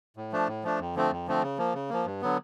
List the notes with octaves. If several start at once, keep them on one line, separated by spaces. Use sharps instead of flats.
A2
F3 A3 D4
A2
F3 A3 D4
F2
D3 F3 A3 C4
F2
D3 F3 A3 C4
C#3
F3 A#3
C#3
F3 A#3
G2
D3 F#3 B3